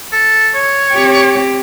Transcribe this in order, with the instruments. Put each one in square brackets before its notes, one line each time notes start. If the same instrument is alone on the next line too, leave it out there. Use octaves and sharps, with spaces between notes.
[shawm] A4
C#5
[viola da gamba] C4 G4